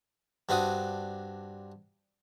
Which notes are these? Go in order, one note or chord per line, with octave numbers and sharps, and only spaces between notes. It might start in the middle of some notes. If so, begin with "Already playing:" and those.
G2 C4 D4 F#4 D#6